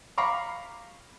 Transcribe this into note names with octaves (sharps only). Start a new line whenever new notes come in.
F5 A#5 B5 C#6 D6